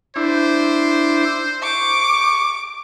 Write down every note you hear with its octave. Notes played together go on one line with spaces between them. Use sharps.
D4 E4 C5
C#6 D6